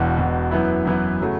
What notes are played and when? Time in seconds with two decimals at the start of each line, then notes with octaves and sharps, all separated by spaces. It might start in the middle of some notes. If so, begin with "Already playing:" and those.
Already playing: E1 E2 B2
0.17 E1 E2 B2
0.51 F#2 E3 B3 E4
0.85 F#2 E3 B3 E4
1.21 C#3 F#3 A3